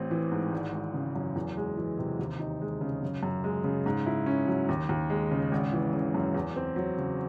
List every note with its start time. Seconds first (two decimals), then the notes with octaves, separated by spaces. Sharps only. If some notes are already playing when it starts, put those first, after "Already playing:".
Already playing: A1 C4
0.11 E3
0.32 G#2
0.52 G#1
0.73 G#1
0.94 C#3
1.16 F#2
1.36 E2
1.57 G#3
1.77 E3
1.99 C3
2.19 D#2
2.39 D#4
2.61 G#3
2.81 C#3
3.02 F#2
3.23 F#2
3.44 G#3
3.64 C#3
3.86 G#2
4.06 E4
4.26 C#4
4.48 F#3
4.69 D#2
4.89 D#2
5.10 G#3
5.31 C#3
5.52 G#1
5.73 E3
5.93 C#3
6.14 F#2
6.34 E2
6.56 C4
6.76 F#3
6.98 C#3